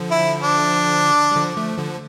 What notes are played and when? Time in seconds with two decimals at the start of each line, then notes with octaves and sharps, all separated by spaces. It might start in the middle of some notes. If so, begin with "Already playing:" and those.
Already playing: D3 F3
0.11 E4
0.43 D4
1.32 G3
1.36 D3 F3
1.57 F3 A3
1.78 D3 F3